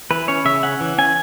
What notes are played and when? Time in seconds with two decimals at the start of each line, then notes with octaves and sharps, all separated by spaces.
0.11 E3 B4
0.28 C#4 C#5
0.45 C#3 E5
0.63 C#4 F#5
0.81 E3
0.98 C#4 G#5